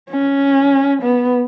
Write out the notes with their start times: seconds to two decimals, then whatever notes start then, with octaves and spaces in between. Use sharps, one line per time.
0.10 C#4
1.02 B3